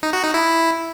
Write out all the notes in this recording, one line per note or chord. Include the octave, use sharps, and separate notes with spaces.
D#4
F#4
D#4
E4